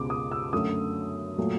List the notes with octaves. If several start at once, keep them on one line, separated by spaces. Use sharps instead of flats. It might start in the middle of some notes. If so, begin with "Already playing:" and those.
Already playing: C#2 B2 G#3 D6
D#6
E6
F#2 D3 F#3 A3 D#6
A#2 F#3 A3